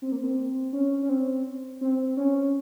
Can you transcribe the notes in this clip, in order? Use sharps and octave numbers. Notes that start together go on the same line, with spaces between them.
C4
A#3
C4
C#4
C#4
C4
C4
C#4